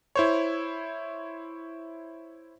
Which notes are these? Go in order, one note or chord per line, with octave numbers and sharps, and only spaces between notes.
E4 C5 C#5